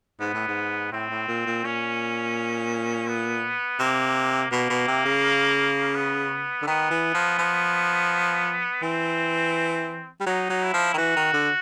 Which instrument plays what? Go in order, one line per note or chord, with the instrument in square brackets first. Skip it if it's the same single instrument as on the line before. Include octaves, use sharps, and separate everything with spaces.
[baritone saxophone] G#2 [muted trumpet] B3
[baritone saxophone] A2
G#2
[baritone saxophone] A2 [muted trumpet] C4
[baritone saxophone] A2
A#2
A#2
[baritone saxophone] A#2 [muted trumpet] C#4
[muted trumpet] B3
[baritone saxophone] C3 [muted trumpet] A#3
[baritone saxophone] B2 [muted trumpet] A#3
[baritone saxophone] B2
C3
C#3
[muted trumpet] B3
[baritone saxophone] D3
[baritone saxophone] D#3 [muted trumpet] B3
[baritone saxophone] E3
F3
F3
[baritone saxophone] E3 [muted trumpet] C4
[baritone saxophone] G3
[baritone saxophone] F#3 [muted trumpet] D#4
[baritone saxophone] F#3
[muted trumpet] E4
[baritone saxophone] F3
D#3
[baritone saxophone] E3 [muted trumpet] F#4
[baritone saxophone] D#3
D3